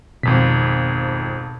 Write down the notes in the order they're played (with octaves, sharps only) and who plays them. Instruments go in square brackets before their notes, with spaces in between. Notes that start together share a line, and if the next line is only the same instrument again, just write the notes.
[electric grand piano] G#1 F2 B6 [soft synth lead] B2